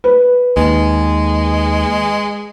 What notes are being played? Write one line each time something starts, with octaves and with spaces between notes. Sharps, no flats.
B4
D#2 G#3